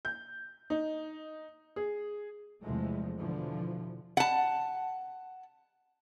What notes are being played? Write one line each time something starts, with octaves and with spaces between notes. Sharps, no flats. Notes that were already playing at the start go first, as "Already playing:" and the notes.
G6
D#4
G#4
E2 C3 F3 G#3 A3
B2 D3 E3 F3
F#5 A5